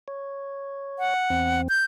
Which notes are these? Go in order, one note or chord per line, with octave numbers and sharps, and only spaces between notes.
C#5
F#5
E2 C4
G6